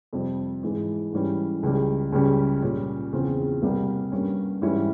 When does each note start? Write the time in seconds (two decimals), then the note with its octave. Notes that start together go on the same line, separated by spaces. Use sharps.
0.13 F2 C3 G3
0.63 G#2 E3 G#3
1.13 G#2 E3 G3 C#4
1.63 C#2 C#3 G3
2.12 C#2 C#3 G3 C#4
2.62 A#2 G3 C#4
3.13 E2 C#3 F3 C4
3.62 C2 C3 G3 A#3
4.12 G2 G3 A#3 C#4
4.62 G#2 E3 G3 C#4 E4